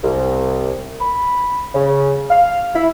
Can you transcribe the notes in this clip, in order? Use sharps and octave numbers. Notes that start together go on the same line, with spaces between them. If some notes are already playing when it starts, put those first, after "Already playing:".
C2
B5
C#3
F5
E4